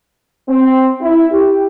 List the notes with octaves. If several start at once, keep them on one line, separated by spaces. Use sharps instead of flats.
C4
E4
G4